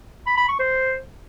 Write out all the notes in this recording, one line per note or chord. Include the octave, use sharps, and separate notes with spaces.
B5
B5
C#6
C5